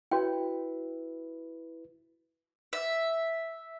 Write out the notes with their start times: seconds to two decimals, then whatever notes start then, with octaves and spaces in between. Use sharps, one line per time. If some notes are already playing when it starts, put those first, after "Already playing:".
0.12 E4 F#4 B4 C#5 G5
2.73 E5